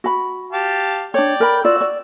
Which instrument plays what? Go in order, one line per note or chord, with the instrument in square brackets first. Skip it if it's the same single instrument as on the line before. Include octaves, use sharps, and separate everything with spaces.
[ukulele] F#4 B5
[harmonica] G4 F5 A5
[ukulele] D4 C#5 [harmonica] D5 G5
[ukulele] A#4 B5
[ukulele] F4 D5 [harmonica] F#4 E6
[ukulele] D5